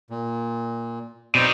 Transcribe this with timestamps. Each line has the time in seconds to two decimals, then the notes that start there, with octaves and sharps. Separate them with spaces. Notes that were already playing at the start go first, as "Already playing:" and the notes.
0.10 A#2
1.35 B2 C4 D#4 C5 D5